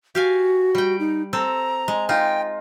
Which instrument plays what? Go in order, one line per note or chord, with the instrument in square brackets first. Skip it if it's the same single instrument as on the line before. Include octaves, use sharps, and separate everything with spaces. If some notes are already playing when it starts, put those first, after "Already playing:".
[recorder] F#4 [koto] G4 F5 G#5
[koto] G3 G5
[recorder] D#4
[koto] C4 A4 [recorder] A#5
[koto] G#3
[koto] D#4 F4 [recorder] G5